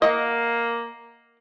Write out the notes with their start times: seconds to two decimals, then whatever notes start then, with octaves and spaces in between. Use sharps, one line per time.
0.02 A#3 D#5 F#5